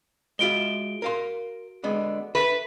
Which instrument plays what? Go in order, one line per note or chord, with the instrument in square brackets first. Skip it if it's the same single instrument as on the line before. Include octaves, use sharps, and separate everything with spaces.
[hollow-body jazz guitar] G#3 F4 E5 [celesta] F#4 D7 G7
[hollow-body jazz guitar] A#4 F5 C6
D3 G#3 B3
[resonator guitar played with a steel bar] B4 [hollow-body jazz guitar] E5